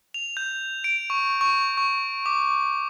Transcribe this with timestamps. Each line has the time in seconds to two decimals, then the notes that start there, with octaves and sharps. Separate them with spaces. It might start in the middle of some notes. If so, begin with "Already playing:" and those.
0.14 F7
0.37 G6
0.84 D7
1.10 C#6
1.41 C#6
1.77 C#6
2.26 D6